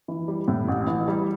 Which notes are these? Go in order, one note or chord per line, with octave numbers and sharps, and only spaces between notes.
E3
G3
A2
A1
E3
G3